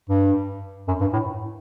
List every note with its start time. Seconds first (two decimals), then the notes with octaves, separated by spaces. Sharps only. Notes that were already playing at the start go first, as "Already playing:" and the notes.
0.09 G2
0.88 F#2
1.01 G2
1.13 A2